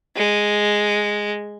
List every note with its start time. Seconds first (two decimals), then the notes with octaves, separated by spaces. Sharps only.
0.16 G#3